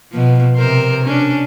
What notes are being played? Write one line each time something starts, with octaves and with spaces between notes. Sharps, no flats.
B2 F3
C3 A#4 C5
C#4 D4